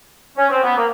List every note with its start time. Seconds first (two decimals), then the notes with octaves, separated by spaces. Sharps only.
0.36 C#4
0.50 C4
0.62 B3
0.76 A#3